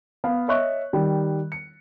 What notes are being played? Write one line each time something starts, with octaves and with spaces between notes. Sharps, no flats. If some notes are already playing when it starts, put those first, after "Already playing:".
B3 F5
C#5 D#5 E5 C#6 F#6
D#3 G3
C#7